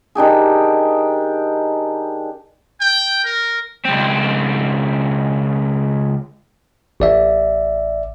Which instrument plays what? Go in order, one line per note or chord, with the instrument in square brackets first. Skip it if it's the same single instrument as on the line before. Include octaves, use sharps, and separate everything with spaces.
[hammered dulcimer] D#3 D4 G4 G#4
[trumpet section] G5
A#4
[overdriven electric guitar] C#2 C4
[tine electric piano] A1 D5 E5